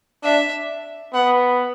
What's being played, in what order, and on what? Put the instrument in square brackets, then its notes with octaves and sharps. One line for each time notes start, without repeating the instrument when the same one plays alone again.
[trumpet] D4 [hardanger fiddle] E5
[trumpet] B3 [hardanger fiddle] F#5